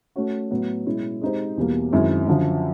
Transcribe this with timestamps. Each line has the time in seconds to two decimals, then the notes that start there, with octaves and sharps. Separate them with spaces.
0.16 A3 C#4 F#4
0.51 A2 F#3 B3
0.86 B2 G#3 C#4 E4
1.22 G#3 C4 D#4 G4 C5
1.57 E2 B2 G3 A#3
1.92 F#2 D#3 G#3 C4 E4
2.27 F#2 D3 F3